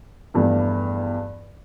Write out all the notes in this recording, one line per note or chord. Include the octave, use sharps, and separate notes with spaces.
E2 G2 F3 A3